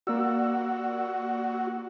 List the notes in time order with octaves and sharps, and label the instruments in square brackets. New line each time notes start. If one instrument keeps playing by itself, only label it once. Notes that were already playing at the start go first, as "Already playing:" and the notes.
[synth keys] A#3 D5 E6 [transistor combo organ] F#4